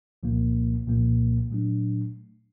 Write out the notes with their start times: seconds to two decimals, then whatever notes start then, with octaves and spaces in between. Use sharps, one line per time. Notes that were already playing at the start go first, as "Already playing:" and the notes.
0.23 C2 A#2 F3 A#3
0.87 C2 A#2 F3 A#3
1.50 A#2 F#3 A3 D4